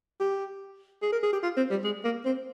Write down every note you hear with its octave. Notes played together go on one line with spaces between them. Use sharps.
G4
G#4
A#4
G#4
G4
F4
C4
G3
G#3
A#3
C4